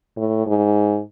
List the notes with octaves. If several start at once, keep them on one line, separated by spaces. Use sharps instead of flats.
A2
G#2